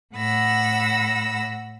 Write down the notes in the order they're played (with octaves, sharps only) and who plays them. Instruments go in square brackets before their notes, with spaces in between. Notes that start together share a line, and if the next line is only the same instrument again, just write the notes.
[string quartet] A2 F#5 B5 E6 A#6